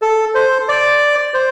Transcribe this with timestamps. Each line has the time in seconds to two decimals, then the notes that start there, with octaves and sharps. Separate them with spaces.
0.02 A4
0.35 C5
0.68 D5
1.34 C5